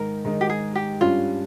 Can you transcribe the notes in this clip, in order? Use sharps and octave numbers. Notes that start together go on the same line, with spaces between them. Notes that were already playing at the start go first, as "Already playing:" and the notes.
Already playing: G#2 D#3 G#3 D#4 A#4
G#2 D#3 G#3 D#4
G4
G#4
G4
G2 G3 C#4 F4